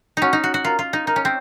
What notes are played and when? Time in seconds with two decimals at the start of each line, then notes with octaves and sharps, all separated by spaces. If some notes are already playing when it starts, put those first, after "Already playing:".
0.17 C#4 D#4 F#4
0.33 D#4
0.44 F#4
0.54 F#4
0.65 F4 A#4
0.79 F4
0.93 D#4
1.07 D#4 A#4
1.16 C#4
1.25 C4